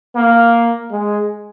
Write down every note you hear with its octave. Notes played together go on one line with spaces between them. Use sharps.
A#3
G#3